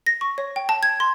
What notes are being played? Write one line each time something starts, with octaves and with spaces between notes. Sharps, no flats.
A#6
C#6
C#5
G5
A5
G#6
C6